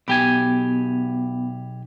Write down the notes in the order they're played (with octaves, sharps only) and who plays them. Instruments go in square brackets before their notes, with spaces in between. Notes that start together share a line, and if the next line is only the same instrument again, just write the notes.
[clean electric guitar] B1 G4 G#5 [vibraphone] B3